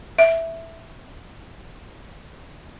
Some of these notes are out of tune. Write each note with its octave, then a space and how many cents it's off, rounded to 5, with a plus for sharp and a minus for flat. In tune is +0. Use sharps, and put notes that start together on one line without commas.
E5 +0